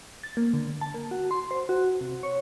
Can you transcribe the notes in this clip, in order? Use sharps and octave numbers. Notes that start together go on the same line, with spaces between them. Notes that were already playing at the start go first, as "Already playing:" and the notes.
A6
A#3
D3
A5
A#3
F#4
C6
C5
F#4
C3
C#5